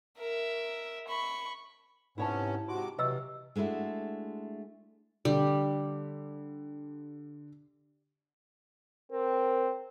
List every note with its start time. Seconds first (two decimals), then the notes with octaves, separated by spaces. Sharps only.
0.18 A#4 E5
1.07 B5 C#6
2.18 G#2 C3 B3 C#4 E4 C#5 A5
2.69 G#2 C3 F#4 C6 D6
2.98 C3 E3 F#3 B4 D#5 E6
3.56 G#3 A3 D4 E4 F#4
5.25 D3 G3
9.12 C4 A#4